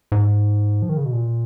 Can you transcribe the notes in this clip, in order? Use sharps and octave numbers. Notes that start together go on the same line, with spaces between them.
G#2
F3
D#3
C#3
B2
A#2